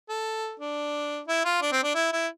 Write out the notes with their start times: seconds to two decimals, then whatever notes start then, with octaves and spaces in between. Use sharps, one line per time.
0.09 A4
0.60 D4
1.28 E4
1.45 F4
1.62 D4
1.72 C4
1.84 D4
1.95 E4
2.12 E4